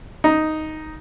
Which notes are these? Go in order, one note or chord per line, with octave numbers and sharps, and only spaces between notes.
D#4